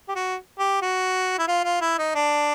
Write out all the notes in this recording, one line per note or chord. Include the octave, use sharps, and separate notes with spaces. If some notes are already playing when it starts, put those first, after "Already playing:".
G4
F#4
G4
F#4
E4
F4
F4
E4
D#4
D4